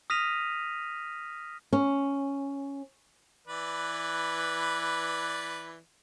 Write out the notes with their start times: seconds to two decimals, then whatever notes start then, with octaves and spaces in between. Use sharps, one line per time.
0.10 D#6 F6 A#6 B6 D#7 F7
1.73 C#4
3.47 E3 B4 D5